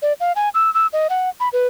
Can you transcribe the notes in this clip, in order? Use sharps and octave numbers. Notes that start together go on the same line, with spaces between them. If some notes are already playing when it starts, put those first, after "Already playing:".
D5
F5
G#5
E6
E6
D#5
F#5
B5
B4